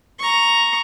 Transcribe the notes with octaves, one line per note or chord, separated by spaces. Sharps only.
A#5 C#6